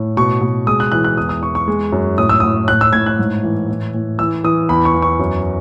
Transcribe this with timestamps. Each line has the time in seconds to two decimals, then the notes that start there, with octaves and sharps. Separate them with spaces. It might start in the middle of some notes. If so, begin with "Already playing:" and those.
Already playing: A2
0.17 B2 C#6
0.41 B2
0.67 G#3 D#6
0.80 F#6
0.92 E3 F#6
1.04 F#6
1.17 E2 D#6
1.29 D#6
1.42 E2 C#6
1.55 C#6
1.68 G#3
1.92 F#2
2.18 A2 D#6
2.29 E6
2.40 A2 D#6
2.68 A2 F#6
2.81 E6
2.93 A2 G#6
3.06 F#6
3.19 G#2
3.43 E3
3.68 A2
3.94 A2
4.19 E3 E6
4.44 E3 D#6
4.69 E2 B5
4.85 C#6
4.94 E2
5.02 C#6
5.19 F#2